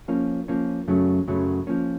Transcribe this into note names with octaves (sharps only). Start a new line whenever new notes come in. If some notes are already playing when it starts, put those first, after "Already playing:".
F3 A#3 C#4
F3 A#3 C#4
F#2 C#3 F#3 A3 C#4
F#2 C#3 F#3 A3 C#4
F3 A#3 C#4